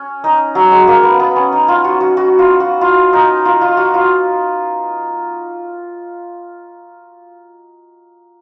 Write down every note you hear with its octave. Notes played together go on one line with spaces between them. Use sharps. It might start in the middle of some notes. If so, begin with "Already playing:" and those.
Already playing: C#4
D#4
F#3
G#3
A#3
B3
B3
C#4
D#4
F4
F#4
F#4
F#4
F4
F#4
F4
D#4
F4
F4
F#4
F4